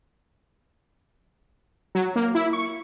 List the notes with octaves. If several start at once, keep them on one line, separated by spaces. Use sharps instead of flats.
F#3
A#3
E4
C#6